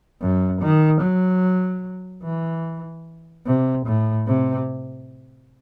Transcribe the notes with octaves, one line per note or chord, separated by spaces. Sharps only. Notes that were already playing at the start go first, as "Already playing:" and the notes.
F#2
D#3
F#3
E3
C3
A2
C3